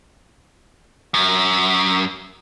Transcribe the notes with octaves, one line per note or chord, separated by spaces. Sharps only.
F#2